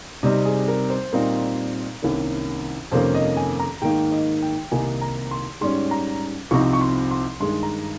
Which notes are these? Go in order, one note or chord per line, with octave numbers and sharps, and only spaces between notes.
C3 G3 C4 D#4 D#5
G#4
A#4
C5
A#2 G3 C4 D#4 A#4
C2 C3 D#3 A#3 C#4
F2 C3 D#3 A#3 C#4 C5
D#5
G#5
A#5
G#2 D#3 A#3 D#4 G5
D#5
G5
C2 C3 D#3 A#3 D#4 G#5
A#5
C6
G#2 G3 C#4 C6
A#5
C2 C3 F3 C4 D#4 C#6
C#6
C6
C6
G2 D#3 G#3 C6
A#5